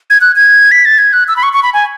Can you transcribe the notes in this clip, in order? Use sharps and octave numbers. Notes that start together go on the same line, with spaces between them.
G#6
F#6
G#6
B6
A6
G#6
F#6
E6
B5
C#6
C#6
B5
G#5